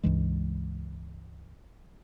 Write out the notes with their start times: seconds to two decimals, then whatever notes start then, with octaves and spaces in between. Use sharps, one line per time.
0.04 C#2 G2 E3 G#3